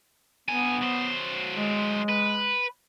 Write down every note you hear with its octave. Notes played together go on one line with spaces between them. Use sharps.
G2 B3 G#5
F#3 C5
G#3
B4